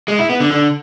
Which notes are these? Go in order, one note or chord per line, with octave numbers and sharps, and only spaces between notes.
G#3
E4
B3
D3
D3